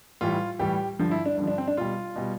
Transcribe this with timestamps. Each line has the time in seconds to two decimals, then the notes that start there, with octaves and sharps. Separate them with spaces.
0.21 A2 E3 G3 F4
0.59 A2 E3 G3 G4
0.99 G2 D3 F3
1.11 E4
1.26 D4
1.37 G2 D3 F3
1.47 D4
1.58 C4
1.68 D4
1.77 B2 G3 F4
2.16 B2 G3